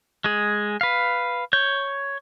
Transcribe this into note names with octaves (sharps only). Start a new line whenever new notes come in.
G#3 G#4
B4 F5
C#5 G6